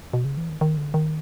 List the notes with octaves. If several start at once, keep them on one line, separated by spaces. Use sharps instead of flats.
B2
C#3
E3
D#3
D#3
D3
D#3